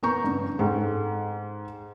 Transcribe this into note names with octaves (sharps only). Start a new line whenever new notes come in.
B3 A#4 A#5 C#6 G6
G2 C#3
G#2 A4 G5